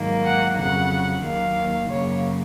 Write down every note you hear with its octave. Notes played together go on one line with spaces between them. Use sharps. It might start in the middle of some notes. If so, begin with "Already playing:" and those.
Already playing: G#2 D#3 F#3 A#3
F#5
F2 C#3 F#3 F#5
D#2 D#3 F#3 A#3 F5
F#2 C#3 F#3 A#3 C#5